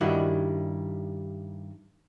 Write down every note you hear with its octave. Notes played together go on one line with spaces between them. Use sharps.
G2 D#3 G3 E4 F#4